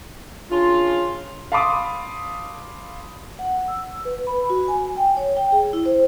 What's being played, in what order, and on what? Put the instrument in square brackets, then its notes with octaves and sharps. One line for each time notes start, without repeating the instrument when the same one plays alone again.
[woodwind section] C#3 D4 F4
[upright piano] F5 A5 B5 C6 D6 D#6
[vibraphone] F#5
E6
B4
B5
F#4
G#5
G5
C#5
G5
G#4
E4
C5